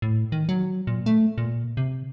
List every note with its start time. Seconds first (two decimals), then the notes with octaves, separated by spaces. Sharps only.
0.02 A2
0.32 D#3
0.49 F#3
0.87 A#2
1.06 A3
1.38 A#2
1.77 C3